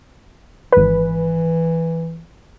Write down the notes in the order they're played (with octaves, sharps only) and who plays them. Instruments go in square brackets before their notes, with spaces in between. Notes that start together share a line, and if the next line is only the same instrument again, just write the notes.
[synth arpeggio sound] G#1 B4 [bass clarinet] E3